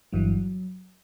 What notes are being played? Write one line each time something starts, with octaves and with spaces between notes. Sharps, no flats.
G1 G2 E3 F#3